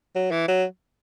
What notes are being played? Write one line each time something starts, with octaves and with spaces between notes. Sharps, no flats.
F#3
E3
F#3